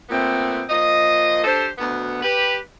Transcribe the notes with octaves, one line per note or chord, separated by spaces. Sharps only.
A#2 A3 B3 C4
A#2 F3 D#5
D4 G4 A4 C5
D2 B2 B3
G4 B4